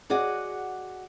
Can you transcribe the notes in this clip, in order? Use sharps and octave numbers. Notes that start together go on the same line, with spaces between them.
F#4 G#4 D5 D#5 F#5